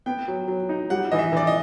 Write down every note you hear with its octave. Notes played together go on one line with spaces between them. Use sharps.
B3 G5
F#3
F#3
D#4
G3 F#5
E3 D#5
E5
E3 D5
D#5